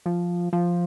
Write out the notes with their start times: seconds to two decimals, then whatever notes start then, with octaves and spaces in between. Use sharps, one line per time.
0.06 F3
0.53 F3